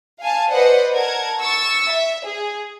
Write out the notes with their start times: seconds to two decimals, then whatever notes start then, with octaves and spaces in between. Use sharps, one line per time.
0.20 F5 G#5 A5
0.52 B4 C5 D5 D#5 F#5
0.95 A#4 F#5 A5 G#6
1.41 C#6 E6 A6
1.90 E5
2.25 G#4